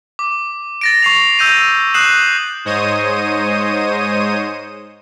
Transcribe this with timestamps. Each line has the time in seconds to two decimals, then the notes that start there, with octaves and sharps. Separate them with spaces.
0.19 D6
0.81 A6 A#6 D7
1.02 C#6 C7 F7
1.39 E6 G6 A#6 D#7
1.94 D#6 F#6 C7 E7 F#7
2.65 G#2 C5 C#5 D#5 D#6 D#7